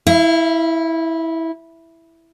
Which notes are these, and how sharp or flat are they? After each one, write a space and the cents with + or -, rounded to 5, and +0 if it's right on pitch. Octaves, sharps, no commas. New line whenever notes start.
E4 -15 E5 +45